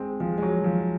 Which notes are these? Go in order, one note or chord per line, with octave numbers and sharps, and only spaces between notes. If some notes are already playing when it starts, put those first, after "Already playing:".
Already playing: G#3 C4
F3 G#3
G#3
F#3
F3